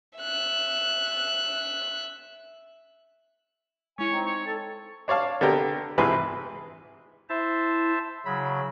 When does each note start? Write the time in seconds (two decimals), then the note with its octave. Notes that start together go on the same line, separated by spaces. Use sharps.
0.19 E5 F#6
3.99 G#3 E4 C#5 G#5
4.11 C4 D#4
4.26 C#5
4.46 A4 A5
5.08 D4 C#5 D5 F5 A5
5.41 D3 B3 G4 A#4
5.98 G#1 C3 E3 G#4 B4 C6
7.29 E4 C5 E5 A5
8.25 C#3 F#3 B5